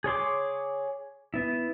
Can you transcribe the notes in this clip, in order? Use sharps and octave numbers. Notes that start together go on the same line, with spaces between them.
G#4 C#5 C6 D6
B3 E4